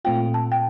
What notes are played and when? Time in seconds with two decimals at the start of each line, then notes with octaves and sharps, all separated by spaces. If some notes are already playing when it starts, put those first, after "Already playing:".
0.05 A#2 A3 C4 F4 G5
0.34 A5
0.52 G5